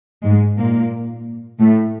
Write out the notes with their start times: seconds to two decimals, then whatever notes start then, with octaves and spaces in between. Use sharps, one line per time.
0.24 G#2 G#3
0.58 A#2 A#3
1.60 A2 A3